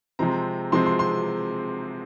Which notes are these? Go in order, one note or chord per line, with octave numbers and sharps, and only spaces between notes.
C3 F3 G#3 C4 A#5
C3 F3 G#3 C4 C6
C6
C6